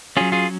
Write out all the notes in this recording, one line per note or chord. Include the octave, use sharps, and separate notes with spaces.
F#3 C#4 F4 G#4
F4 G#4